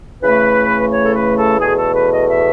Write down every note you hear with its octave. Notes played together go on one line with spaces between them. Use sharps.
C#3 E3 A3 B4
C#5
A4
B4
A4
E2 B2 A3 G#4
A4
B4
D#5
E5